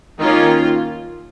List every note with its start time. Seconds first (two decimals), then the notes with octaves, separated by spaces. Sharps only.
0.20 D#3 A#3 C#4 F4